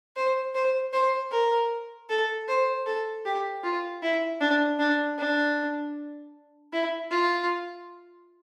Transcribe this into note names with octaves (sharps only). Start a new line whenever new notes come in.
C5
C5
C5
A#4
A4
C5
A4
G4
F4
E4
D4
D4
D4
E4
F4